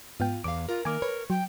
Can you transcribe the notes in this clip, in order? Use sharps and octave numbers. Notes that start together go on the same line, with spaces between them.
G#2 B3 F4 G5
E2 F5 D6
F4 A#4
D#3 A#3 A#4 G#5 D6
B4 C#5
F#3 G5